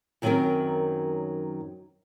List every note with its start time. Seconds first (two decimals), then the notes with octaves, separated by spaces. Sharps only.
0.22 F#2 D#3 F#3 G3 C4 A#4